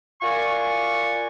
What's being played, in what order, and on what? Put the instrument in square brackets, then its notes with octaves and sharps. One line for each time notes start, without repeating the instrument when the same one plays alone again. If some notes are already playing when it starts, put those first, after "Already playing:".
[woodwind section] F4 F#4 A#4 D5 G#5 C#6